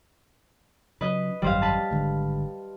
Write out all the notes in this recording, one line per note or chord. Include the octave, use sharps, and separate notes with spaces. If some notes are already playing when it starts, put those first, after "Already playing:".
C#3 F#3 B4 D#5
G#1 F#2 G3 C5 F5
B4 A5
G#1 D3 G#3